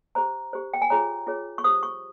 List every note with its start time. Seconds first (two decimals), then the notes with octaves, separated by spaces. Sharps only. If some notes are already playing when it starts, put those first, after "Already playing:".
0.15 G4 C5 A#5
0.53 G4 C5
0.74 G5
0.82 G#5
0.90 F4 G#4 C#5 A#5
1.27 F4 G#4 C#5
1.58 C#6
1.64 G4 C5 D#6
1.83 C#6